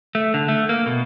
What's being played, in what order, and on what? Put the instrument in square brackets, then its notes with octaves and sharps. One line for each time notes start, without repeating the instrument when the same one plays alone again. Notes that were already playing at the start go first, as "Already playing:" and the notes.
[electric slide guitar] A3
D3
A3
A#3
B2